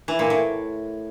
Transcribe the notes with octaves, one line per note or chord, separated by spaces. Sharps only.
E3
A#2
A2